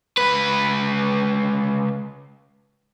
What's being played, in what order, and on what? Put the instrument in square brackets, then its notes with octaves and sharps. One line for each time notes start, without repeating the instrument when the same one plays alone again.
[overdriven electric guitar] C#2 B4